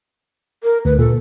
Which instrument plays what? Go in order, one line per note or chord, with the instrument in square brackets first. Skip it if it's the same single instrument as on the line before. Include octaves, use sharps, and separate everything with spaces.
[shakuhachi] A#4
[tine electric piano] D2 [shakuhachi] B4
[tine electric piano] A#2 [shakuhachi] A4